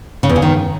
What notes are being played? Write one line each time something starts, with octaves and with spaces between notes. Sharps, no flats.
C#3
E2
C#3
D#3